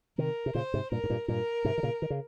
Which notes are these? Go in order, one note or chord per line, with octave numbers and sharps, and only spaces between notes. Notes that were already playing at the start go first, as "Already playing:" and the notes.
C3 D#3 A#4
C3
A#2 C#3 C5
G#2 C3
G2 A#2 A#4
G#2
G2 A#2
G2 A#2 A#4
G#2 C3
D#3
A#2 C#3
D#3
C#3